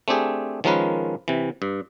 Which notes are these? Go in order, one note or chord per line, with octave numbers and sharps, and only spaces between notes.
A3 C4 D4 G4 G#4
D#3 F3 G#3 C#4 A#4 B4
C3 E3
G2